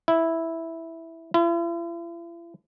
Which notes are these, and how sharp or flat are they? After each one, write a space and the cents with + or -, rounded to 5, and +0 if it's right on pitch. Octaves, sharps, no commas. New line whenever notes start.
E4 -5
E4 +45